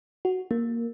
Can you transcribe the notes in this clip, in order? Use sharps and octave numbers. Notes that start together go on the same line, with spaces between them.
F#4
A#3